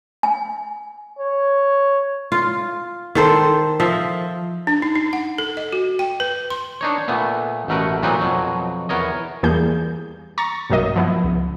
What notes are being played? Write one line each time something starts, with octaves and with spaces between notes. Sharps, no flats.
G#5
C#5
F4
D#3 A4 C5
F3 D#5 E5
D4
D#4
D#4
F#5
A4
D#5
F#4
G5
B4
C6
D4 D#4 C#5
A#2 A3 B3
A1 B2 A3 A#4 B4 F#5
A#2 F#3 C4 D#4 B4
F2 B2 F#3
E2 B3 A#4 C#5 D#5
E2 E3 G3 A#3 G#4 G6
A#5 C#6 A6 A#6
B1 G2 F#3 A#3 D#5
F3 B3 E4
C#2